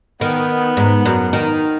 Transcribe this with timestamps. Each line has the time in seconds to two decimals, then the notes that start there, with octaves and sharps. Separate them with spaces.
0.21 D#3 B3
0.77 G#2
1.05 F#2
1.33 D#3